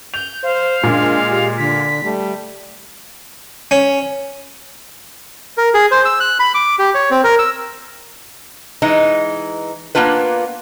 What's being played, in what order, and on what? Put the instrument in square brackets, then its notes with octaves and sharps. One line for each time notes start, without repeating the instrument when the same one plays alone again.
[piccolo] G6 [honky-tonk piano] F7
[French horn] C5 [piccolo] F5
[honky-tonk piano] A#2 [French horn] G#3 [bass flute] D4
[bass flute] G4
[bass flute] D3 [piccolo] B6
[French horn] G3 [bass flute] A3
[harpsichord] C#4
[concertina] A#4
G#4
C5
E6
F#6
B5
D6
G4
C#5
C4
A#4
E6
[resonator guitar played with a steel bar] E3 G#3 D#4
A#3 B3 D4 F4 B4